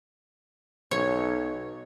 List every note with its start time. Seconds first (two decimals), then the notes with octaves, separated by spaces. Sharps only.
0.91 B1 C#5